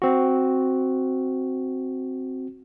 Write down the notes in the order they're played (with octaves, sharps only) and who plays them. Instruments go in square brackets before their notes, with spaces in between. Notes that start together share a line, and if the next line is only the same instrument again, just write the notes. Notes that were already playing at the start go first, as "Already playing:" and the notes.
[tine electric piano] C4 F#4